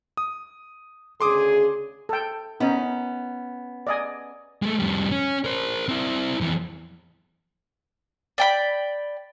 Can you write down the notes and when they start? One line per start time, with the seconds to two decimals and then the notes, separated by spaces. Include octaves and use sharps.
0.17 D#6
1.21 D2 C#3 G#4 C6 D6 D#6
2.09 A4 G5
2.60 B3 C#4 D#4
3.87 D5 D#5 G#5
4.62 G#3 A3
4.79 F2 G3
5.12 C#4
5.45 A#4 C5
5.88 C4 E4
6.40 F2 E3
8.38 D5 G5 B5